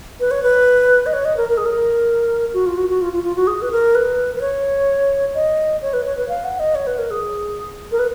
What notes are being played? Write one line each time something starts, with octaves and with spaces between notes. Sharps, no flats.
B4
C#5
B4
D#5
C#5
D#5
A#4
A#4
G#4
A#4
F#4
F4
F#4
F#4
F4
F4
F4
F#4
G#4
B4
A#4
B4
B4
C#5
D#5
C#5
B4
C#5
B4
F5
F#5
D#5
C#5
B4
A#4
G#4
A#4
B4